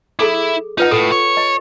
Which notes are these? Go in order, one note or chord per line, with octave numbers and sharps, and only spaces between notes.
E4 G#4 A4 D6
D#4 F4 B4 F#5
A2 A4 D#6
C#5
D#5